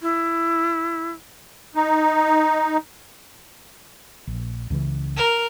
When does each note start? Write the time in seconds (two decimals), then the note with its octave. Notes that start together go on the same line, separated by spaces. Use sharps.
0.01 E4
1.75 D#4
4.27 A#1
4.70 C#2 C#3 E3
5.16 A#4